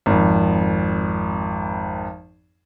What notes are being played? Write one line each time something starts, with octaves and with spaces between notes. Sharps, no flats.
G#1 F2